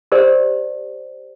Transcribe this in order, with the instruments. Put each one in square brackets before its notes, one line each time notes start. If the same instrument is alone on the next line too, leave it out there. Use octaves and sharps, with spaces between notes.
[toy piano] G4 A#4 C5 D5